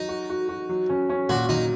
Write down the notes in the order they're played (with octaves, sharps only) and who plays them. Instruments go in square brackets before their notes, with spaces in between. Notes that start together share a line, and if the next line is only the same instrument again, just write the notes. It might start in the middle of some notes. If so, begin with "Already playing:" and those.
Already playing: [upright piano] F#3 [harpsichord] D#4
[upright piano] F#4
F#4
F#4
F#3
C#4
C#4
[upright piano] A#2 [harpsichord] F#4
[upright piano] F#3 [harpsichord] D#4